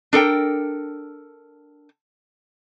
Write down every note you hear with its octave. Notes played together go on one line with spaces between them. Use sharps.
D4 A4 A#4 G5